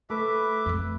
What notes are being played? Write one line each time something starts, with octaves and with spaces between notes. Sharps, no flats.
A3 B4 E5 D6
F2 A3